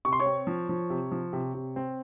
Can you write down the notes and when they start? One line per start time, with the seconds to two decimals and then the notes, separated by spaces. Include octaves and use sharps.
0.05 C3 C#6
0.13 C6
0.20 C#5 C#6
0.26 C4
0.47 F3
0.69 F3
0.90 C3
1.11 F3
1.33 C3
1.54 C3
1.76 C4